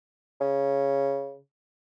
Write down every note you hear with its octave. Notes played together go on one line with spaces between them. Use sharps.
C#3